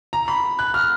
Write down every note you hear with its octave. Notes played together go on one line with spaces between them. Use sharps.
A#5
B5
F#6
F6